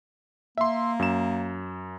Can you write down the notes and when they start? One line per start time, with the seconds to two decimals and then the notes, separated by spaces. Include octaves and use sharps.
0.58 A#3 E5 C6
0.99 F#2 E7